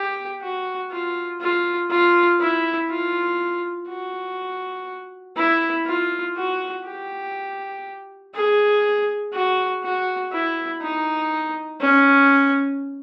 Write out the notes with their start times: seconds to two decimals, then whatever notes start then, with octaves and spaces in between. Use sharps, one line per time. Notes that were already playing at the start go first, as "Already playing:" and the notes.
Already playing: G4
0.42 F#4
0.91 F4
1.41 F4
1.90 F4
2.40 E4
2.90 F4
3.89 F#4
5.37 E4
5.86 F4
6.37 F#4
6.85 G4
8.34 G#4
9.33 F#4
9.83 F#4
10.33 E4
10.82 D#4
11.81 C#4